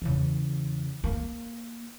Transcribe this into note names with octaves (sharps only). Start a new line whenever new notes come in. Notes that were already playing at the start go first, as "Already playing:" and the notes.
E2 C#3
A#3